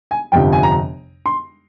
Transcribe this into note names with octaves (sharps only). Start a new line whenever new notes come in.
G#5
G1 F2 C3 F3 G5
G#5
A#5
C6